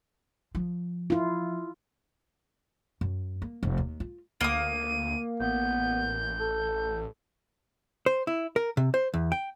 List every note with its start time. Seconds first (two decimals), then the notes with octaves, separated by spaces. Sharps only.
0.55 F3
1.10 E4 F4
3.01 F#2
3.42 A#3
3.63 F1
3.77 D#2
4.00 F4
4.41 D2 A#3 D#6 D#7
5.40 A1 B3 G6
6.40 A4
8.06 C5
8.27 E4
8.56 A#4
8.77 C3
8.94 C5
9.14 E2
9.32 G5